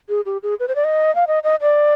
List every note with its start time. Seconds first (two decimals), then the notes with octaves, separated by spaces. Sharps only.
0.09 G#4
0.26 G4
0.43 G#4
0.60 B4
0.68 C5
0.75 D5
0.84 D#5
1.15 F5
1.27 D#5
1.44 D#5
1.61 D5